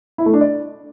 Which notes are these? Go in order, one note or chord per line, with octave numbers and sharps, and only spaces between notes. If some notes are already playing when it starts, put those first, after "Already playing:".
E4
A3
D4
D5